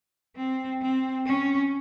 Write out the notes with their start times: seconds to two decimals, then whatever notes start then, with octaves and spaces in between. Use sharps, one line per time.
0.36 C4
0.81 C4
1.26 C#4